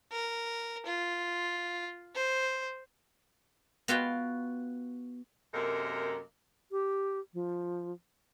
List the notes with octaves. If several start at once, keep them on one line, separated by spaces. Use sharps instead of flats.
A#4
F4
C5
B3 F4 F#4 F5 G5
F#2 C3 A#3 A4 A#4 D#5
G4
F3